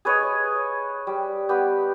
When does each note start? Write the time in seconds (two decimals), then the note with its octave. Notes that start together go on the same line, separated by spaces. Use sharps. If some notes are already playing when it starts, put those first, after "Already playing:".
0.05 G#4 B4 C#5 D#5
0.23 C#5
1.07 G3
1.49 B3 G4